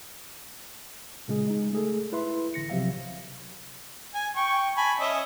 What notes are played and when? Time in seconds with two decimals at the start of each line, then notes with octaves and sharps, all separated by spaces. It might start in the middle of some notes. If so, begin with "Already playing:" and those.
1.28 A#2 C#3 G#3 G#4
1.47 G#3 D#4
1.73 A3 G#4 A4
2.12 E4 B4 E5 C6
2.54 A1 D3 A#6 C#7
2.70 B1 C3 F3 F#3 E5 F5
4.14 G#5
4.36 G5 C#6
4.77 G#5 A5 B5
5.00 C#4 D#5 E5